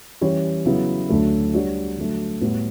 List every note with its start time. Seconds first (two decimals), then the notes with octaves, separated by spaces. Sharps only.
0.21 E3 G3 C#4 G4 C#5
0.66 C#3 F#3 B3 E4
1.09 D2 D3 F#3 A3
1.53 G3 D4 F#4 C#5
1.97 D3 F#3 A3
2.41 A2 G3 B3 F#4